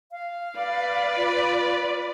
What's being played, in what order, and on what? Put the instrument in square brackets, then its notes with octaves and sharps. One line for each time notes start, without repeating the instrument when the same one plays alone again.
[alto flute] F5
[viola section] B4 D5
[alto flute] F4